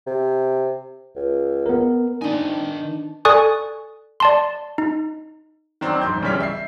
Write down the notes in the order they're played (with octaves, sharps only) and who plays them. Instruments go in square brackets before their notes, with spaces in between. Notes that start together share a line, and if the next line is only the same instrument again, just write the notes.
[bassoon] C3
C#2
[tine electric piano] B3 A#4
[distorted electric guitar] D#3 G#5 [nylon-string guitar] B3 D4 D#4
[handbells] A4 D5 G#5 C#6 D#6 F#6
D5 A5 C6
D#4
[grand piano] D#3 F#3 C4 D4
E1 G#2 C6 G6
E1 C#3 E3 G3 C#5 B6
E5 C7